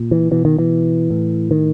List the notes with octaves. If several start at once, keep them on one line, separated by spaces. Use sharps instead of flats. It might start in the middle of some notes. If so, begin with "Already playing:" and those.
Already playing: A#2
E3
B2 E3
D#3
E3
A2
D#3